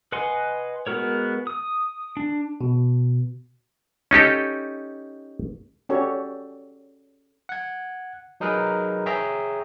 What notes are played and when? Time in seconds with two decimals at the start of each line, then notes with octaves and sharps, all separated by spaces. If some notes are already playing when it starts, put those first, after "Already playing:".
0.12 B4 D#5 F#5 G#5 C6
0.87 G#3 B3 F#4 A#4 C#5
1.47 D#6
2.17 D4
2.61 B2
4.11 C#4 D#4 G4 A4
5.89 C#4 F#4 G4 A4 C#5 D5
7.49 F#5 G#6
8.40 F#3 D#4 G#4 A#4 B4
9.06 G#4 C#5 E5 G5 A#5